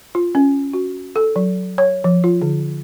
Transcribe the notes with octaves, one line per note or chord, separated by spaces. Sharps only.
F4
C#4
F#4
A4
F#3
C#5
F3
F4
D3